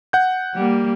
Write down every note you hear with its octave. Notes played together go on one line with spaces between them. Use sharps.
F#5 G6
G3 A#3